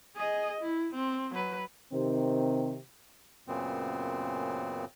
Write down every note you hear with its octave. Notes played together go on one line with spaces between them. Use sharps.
G#4 D#5
E4
C4
F#3 B4
C3 D#3 C4
F#2 A#2 C#3 B3 C4